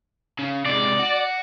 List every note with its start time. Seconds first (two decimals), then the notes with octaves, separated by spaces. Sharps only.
0.39 C#3
0.65 C3 G#3 D5
0.99 F#4